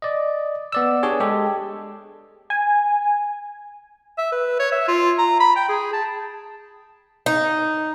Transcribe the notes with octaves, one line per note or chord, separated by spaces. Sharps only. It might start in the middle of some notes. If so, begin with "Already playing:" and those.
D5 D#5
B3 D5 E6
D4 G4 G#4 C#5
G#3 G4 A4
G#5
E5
B4
C#5
E5
F4
A#5
B5
G5
G#4
A5
D#4